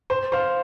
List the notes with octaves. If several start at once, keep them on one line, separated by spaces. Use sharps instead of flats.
C5
C5 F5